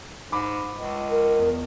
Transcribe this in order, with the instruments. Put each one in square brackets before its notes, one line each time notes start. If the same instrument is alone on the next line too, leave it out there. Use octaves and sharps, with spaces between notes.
[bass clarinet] G#2 [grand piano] B5 D6
[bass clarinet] C#2
[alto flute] A#4
[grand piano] E2